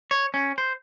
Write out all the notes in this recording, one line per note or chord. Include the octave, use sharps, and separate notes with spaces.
C#5
C#4
C5